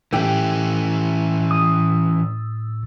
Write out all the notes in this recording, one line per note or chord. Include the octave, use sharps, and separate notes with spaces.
A2 E3 A3 C#4 G4
D#6